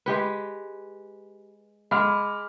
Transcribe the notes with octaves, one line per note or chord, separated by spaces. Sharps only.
G#3 G4 B4
G#3 B5 D6 F6